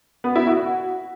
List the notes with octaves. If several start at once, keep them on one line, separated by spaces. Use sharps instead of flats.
B3
E4
F#4